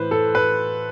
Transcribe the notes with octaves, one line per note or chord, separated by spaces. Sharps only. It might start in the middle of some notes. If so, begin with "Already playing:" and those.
Already playing: A2 E3 B4 C5
A4
B4